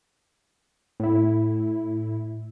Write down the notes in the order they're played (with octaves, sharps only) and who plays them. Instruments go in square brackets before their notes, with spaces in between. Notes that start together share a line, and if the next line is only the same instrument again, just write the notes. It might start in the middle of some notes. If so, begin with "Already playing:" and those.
[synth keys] A2 E4